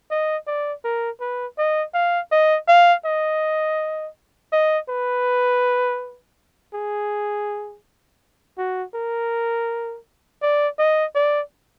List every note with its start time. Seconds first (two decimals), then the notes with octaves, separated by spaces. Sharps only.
0.11 D#5
0.47 D5
0.84 A#4
1.21 B4
1.58 D#5
1.94 F5
2.32 D#5
2.68 F5
3.05 D#5
4.53 D#5
4.89 B4
6.74 G#4
8.58 F#4
8.95 A#4
10.42 D5
10.79 D#5
11.15 D5